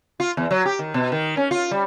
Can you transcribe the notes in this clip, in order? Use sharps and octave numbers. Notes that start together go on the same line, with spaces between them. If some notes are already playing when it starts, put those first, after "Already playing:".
F4
E2
F#3
G4
D#3
B2
D#3
C#4
F4
G3